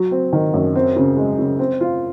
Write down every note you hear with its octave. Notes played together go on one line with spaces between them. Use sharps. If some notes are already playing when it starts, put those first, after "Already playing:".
Already playing: F#3
C4
D#3
F#2
C4
C#3
G#3
C#3
C4
F4